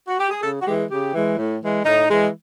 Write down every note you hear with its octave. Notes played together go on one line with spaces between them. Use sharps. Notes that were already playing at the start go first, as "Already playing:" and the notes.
F#4
G4
G#4
C#3 A4
F#4
E3 G#3 G4
C#3 G4
E3 G#3
A2
E3 G#3
A2 D#4
E3 G#3